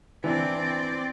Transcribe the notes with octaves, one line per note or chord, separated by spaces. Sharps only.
E3 C4 D4 D5